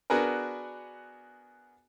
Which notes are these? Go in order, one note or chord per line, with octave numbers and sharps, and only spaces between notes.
B3 D4 F#4 G#4 A#4 B4